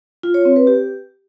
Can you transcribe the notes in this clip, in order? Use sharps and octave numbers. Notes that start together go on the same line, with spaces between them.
F4
C#5
C4
B4
G4